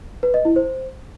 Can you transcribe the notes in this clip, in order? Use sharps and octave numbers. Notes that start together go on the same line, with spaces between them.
B4
D#5
E4
C5